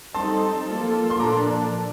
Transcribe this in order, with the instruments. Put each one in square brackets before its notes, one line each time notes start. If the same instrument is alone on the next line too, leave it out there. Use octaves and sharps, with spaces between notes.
[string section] G3 C4 D#4 A4 [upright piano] A5 C6
[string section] F3 A#3 F4 A4
[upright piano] C6
[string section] A#2 F3 A#3 D4 A4 [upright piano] A#5 D6